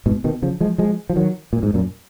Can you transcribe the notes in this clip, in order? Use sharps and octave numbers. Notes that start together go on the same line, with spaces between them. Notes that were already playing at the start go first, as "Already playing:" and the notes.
G#2 B2
B2 D#3
C#3 F3
F3 G#3
F3 G#3
F3
D#3 F#3
A#2
G#2
F#2 A#2